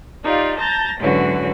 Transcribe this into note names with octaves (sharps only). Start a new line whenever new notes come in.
D#4 F4 G4 D5 F5
A5 A#5 G6 A6 A#6
G#2 D3 E3 F#3 C#4 F#4